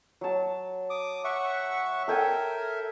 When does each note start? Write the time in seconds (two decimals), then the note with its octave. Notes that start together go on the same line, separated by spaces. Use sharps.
0.21 F#3 A5
0.90 D6 D#6
1.24 E5 F#5 C#6
2.08 A4 A#4 E5 G5 G#5